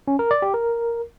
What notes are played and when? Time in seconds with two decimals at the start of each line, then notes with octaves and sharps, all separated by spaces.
0.08 C#4
0.19 A#4
0.31 D5
0.42 G4
0.54 A#4